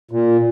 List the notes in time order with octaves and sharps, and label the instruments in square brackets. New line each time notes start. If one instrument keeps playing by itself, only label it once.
[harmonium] A#2